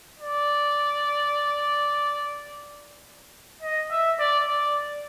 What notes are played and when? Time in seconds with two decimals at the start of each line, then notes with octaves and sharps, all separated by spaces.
0.20 D5
3.63 D#5
3.91 E5
4.20 D5
4.47 D5